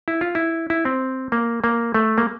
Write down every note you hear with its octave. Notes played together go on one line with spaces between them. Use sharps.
E4
F4
E4
E4
C4
A#3
A#3
A3
A#3